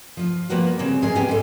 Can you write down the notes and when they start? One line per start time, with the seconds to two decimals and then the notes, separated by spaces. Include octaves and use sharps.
0.17 F3 F4
0.50 F3 G3 A#3 B3 F#4
0.79 C#3 F#3 G3 C4
1.02 E2 G#2 A#3 C#4 G#4 G#5
1.15 B3 C#4 G4 G5 G#5
1.29 G#3 A4